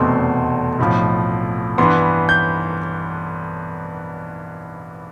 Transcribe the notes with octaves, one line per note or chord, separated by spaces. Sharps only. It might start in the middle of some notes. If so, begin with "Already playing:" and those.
Already playing: F1 E2 B2 A3 C4 C6
B1 A2 F3
G2 E3 B3 C6
G6